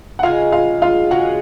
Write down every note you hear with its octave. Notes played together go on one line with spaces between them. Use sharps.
F#5
C#3 G#3 D#4 F4 G#4 F5
F4 F5
F4 F5
C#3 G#3 D#4 F#4 G#4 F#5